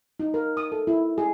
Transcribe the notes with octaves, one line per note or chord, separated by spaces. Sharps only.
D#4
A#4
D#6
A4
E4
G#4